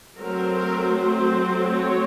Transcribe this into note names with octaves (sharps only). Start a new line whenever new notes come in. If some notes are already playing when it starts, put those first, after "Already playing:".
F#3 A3 C4 A#4
A#4
C5
C#5